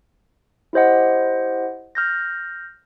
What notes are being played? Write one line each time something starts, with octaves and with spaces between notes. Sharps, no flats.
E4 G4 C5 D#5 F#5
F6 G6 A#6